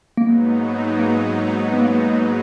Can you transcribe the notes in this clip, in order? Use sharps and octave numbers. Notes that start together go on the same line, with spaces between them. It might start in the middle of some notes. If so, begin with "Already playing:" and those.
G#2 F#3 A#3 B3 D#4
A#3
B3
A#3